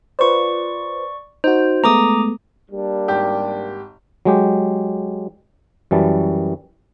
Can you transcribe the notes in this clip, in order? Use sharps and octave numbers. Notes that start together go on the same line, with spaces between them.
F4 B4 C5 D5 C#6
D#4 F#4 C5
G#3 A3 B3 A#5 D6 D#6
G3 A#3 D4
G#1 G4 G5
F#3 G#3 G4
F#2 E3 G3 A5